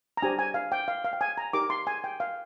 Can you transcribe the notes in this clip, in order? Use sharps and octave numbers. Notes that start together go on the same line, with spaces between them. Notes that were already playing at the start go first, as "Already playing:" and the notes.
A#5
D4 G4 C5 G#5
G#5
F5
G5
F5
F5
G5
G#5
A#5
D#4 G4 A#4 D6
C6
G#5
G5
F5